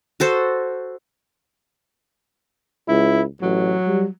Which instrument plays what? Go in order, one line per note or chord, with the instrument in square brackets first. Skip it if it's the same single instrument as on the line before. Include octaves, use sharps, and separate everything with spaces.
[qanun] F#4 A4 C5
[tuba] C#2 [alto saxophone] E4
[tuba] A1 [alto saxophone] F#3
[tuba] G3